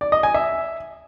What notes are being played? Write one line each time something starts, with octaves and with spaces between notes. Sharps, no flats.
D5
D#5
G#5
E5